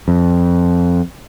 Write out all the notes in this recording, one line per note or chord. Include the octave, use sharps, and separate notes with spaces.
F2